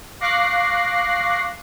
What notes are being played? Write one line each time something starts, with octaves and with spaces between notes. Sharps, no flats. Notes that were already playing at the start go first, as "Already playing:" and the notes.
F5 C#6 D6 F#6 A#6 C7